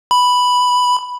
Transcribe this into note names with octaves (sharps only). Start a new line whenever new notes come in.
B5